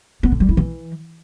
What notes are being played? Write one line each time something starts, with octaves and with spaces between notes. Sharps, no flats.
B3
D3
G3
E4
E3